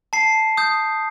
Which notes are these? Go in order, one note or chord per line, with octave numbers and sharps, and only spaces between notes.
A5 C7
D#6 G6